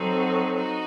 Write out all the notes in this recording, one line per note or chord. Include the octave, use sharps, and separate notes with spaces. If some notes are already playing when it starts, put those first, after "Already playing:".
Already playing: F#3 C4 D#4 F#4 A4
D#4 F#4